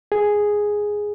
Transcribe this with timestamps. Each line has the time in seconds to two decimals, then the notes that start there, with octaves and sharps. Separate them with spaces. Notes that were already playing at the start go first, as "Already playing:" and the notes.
0.12 G#4